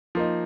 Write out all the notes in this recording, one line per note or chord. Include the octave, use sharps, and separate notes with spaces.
F3 A#3 D#4